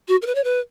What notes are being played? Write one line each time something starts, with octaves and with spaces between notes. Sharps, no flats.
F#4
A#4
B4
C#5
B4